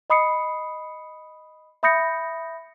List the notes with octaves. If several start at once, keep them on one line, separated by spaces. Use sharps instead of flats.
D#5 B5 D#6 C7 C#7
E5 B5 D#6 G6 A#6 C#7